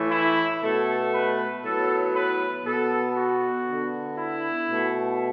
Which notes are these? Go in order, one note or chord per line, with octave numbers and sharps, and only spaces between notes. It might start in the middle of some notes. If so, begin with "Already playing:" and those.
Already playing: A2 E3 A3
E4
B2 A3 A4
B4
A2 F#3 B3 A4
B4
B2 B3 A4
F#4
D3 B3
E4
B2 A3